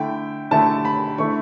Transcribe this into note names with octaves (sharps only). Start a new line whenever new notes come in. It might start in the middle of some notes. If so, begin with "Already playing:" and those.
Already playing: D3 A3 E4 G5
D3 A3 E4 A5
B5
D3 A3 E4 C#6